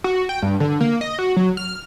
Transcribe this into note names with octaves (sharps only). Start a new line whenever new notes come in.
F#4
G5
G2
D3
A#3
D#5
F#4
F#3
F6